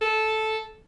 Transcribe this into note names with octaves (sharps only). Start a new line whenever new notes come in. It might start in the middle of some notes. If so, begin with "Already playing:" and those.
A4